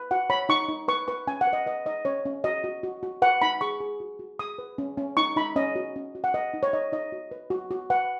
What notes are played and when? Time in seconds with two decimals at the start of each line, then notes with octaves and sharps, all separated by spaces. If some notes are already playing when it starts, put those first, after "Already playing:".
Already playing: B4
0.11 F#4 F#5
0.30 C#5 B5
0.49 D#4 C#6
0.68 D#4
0.88 B4 C#6
1.08 B4 C#6
1.27 C#4 G#5
1.41 F#5
1.47 B4
1.53 D#5
1.66 B4 D#5
1.86 D#4 D#5
2.05 C#4 C#5
2.25 C#4
2.44 F#4 D#5
2.64 F#4
2.83 F#4
3.03 F#4
3.22 B4 F#5
3.42 D#4 B5
3.61 G#4 C#6
3.80 G#4
4.00 F#4
4.19 F#4
4.39 G#4 D#6
4.58 B4
4.78 C#4
4.98 C#4
5.17 D#4 C#6
5.36 D#4 B5
5.56 C#4 D#5
5.76 F#4
5.96 C#4
6.15 F#4
6.24 F#5
6.34 B4 D#5
6.54 D#4
6.63 C#5
6.73 D#4 D#5
6.92 D#4 D#5
7.12 F#4
7.31 B4
7.50 F#4
7.71 F#4
7.90 B4 F#5